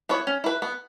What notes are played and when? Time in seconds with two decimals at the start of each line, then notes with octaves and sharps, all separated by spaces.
0.09 B3 E4 C#5
0.27 C#4
0.44 E4 B4
0.62 B3